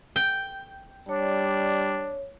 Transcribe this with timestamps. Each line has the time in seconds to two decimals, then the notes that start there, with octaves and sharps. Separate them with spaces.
0.16 G5
1.09 G3 D4 C#5